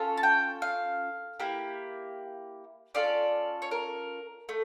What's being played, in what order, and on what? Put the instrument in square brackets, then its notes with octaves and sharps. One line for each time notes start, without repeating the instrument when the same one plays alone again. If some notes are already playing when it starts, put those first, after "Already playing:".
Already playing: [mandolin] C#4 F4 A4
A5
G5
F5
A#3 E4 G4
C#4 F4 A4 D5
C#5
A#4
A3